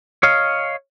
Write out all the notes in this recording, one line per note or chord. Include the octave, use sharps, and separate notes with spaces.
C#5 D#5 F5